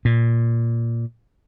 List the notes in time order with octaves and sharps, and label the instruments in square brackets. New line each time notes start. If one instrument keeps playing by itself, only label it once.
[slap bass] A#2